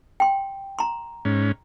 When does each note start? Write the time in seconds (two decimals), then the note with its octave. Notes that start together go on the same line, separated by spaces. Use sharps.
0.20 G5 C6
0.79 A#5 C6
1.25 G#2 C#4